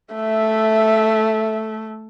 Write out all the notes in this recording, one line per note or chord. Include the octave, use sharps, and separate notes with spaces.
A3 E5